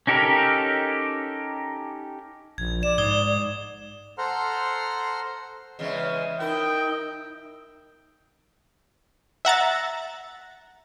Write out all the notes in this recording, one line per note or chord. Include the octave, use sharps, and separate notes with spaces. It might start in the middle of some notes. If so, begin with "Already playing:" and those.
C#4 D#4 G4 A4 A#4
A#1 G#6
D5 E7
G#2 D#6 G#6 G7
A4 C5 F#5 A#5 C6 F6
E2 C#3 G#3 D#5 E5
D#4 E4 A#4 G5
E5 F#5 A#5 A6